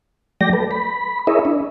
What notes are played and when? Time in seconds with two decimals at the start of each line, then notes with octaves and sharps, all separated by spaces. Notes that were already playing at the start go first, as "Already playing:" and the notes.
0.41 F#3 A3 D5 G5 A#6
0.53 A4 B4
0.71 B5
1.27 E4 G#4 A#4 C#5 D#5 E5
1.45 D4